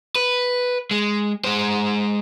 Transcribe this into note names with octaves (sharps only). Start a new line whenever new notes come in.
B4
G#3
G#3 C5